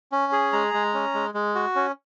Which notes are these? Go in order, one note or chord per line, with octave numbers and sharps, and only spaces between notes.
C#4
G#4
G#3 A#5
G#3
C#4
G#3
G#3
F#4
C#4